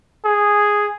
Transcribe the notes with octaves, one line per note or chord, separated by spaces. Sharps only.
G#4